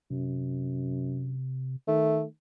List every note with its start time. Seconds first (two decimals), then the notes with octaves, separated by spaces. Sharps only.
0.11 F#2 C3
1.88 D#3 A3